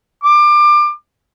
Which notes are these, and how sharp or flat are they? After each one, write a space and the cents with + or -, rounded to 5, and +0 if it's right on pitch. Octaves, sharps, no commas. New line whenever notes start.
D6 +25